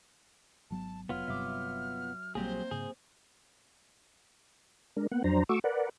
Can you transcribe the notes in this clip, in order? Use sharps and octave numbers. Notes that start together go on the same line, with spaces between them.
G#1 F#3 B3 A5
F1 F#3 B3 F4 F6
G1 G2 C3 E5 D6
A#1 F#3 G3 A#3 C4 G4 G#4 C5
G#2 C#3 G#4
G#3 D4 A#4
A#3 B3 F#5
F2 F#3 D4 C5 A#5
A3 F#4 C#6 D6 E6
A#4 B4 D5 F#5